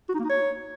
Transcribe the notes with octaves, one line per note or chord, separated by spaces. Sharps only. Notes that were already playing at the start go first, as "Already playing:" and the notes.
F#4
D#4
A#3
D#4
C#5